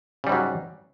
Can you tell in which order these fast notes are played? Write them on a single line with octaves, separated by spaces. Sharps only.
C#3 G3 G#2 F#3